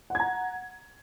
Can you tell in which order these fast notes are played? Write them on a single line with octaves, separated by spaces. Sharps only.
F#5 G#6 A#5